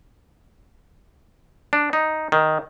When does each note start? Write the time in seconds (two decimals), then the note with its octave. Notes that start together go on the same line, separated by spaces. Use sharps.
1.73 D4
1.93 D#4
2.32 D#3